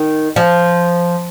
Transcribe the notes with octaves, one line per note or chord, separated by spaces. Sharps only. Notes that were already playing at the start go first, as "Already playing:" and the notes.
Already playing: D#3
F3